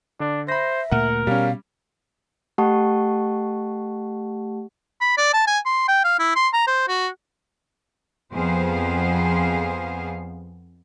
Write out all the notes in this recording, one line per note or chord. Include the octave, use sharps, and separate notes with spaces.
D3 D4
C5 E5 B5 A#6
D2 A#2 A3 A#4 F#5
B2 G3 C#4 F5
A3 G4 F#5 A5 C#6
B5
D5
A5
G#5
C6
G5
F5
E4
C6
A#5
C5
F#4
F2 F3 B3 G#4 C5 F5